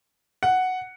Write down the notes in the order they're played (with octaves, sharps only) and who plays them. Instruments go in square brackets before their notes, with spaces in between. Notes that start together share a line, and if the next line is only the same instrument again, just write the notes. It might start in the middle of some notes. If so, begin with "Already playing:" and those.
[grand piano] F#5